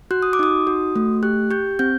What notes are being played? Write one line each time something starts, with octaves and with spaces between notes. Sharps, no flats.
F#4 F#6
D#6
D6
D#4 D#6
F#4
A3
G4 F#6
G4 G6
C4 G6